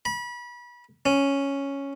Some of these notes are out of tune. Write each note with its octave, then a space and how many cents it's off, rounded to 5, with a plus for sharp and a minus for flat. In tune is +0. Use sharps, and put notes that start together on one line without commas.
B5 -30
C#4 +0